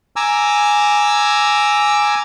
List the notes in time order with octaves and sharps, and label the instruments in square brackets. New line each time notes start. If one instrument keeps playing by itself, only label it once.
[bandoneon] G#5 A#5 D6 E6